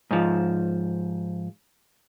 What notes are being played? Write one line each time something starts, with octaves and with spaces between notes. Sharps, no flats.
G#2 F3